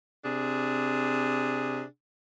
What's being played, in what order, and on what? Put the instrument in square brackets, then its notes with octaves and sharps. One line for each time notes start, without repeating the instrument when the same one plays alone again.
[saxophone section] C3 D4 G#4